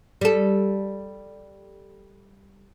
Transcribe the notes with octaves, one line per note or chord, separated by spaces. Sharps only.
G3 A4